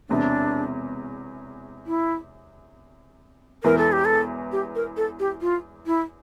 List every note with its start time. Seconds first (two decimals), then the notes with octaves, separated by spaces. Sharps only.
0.09 E1 E2 C3 D4
1.87 E4
3.63 E1 E2 E3 A#4
3.78 A4
3.92 G4
4.05 A4
4.52 G4
4.75 A#4
4.97 A4
5.20 G4
5.42 F4
5.86 E4